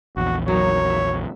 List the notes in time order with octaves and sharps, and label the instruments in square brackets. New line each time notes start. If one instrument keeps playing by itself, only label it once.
[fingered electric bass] A#1 E2 [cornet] F#4
[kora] F#3 A#3 D#4 [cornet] C#5
[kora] E5